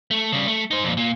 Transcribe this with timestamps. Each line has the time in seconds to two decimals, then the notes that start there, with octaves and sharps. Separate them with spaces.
0.11 A3
0.32 C#3 G3
0.48 A3
0.71 D#4 C5
0.83 F2 A#2
0.97 A#2